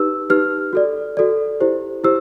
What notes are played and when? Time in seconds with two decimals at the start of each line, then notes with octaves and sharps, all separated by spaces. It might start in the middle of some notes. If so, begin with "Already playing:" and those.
Already playing: D#4 G4 B4 E6
0.30 D#4 G4 B4 F6
0.73 F#4 A4 D5
1.17 F#4 A4 D5
1.61 E4 G4 C5
2.04 E4 G4 C5 E6